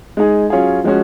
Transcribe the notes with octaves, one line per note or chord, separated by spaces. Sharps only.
G#3 D#4 G#4
F#3 C#4 F4 G#4
F3 G#3 C#4 F#4